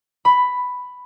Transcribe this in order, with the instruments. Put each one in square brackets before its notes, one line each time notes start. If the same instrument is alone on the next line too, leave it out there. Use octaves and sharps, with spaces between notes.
[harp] B5